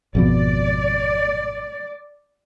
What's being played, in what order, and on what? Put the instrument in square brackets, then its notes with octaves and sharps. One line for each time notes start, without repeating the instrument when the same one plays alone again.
[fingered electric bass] G#1 F2 B2 [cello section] D5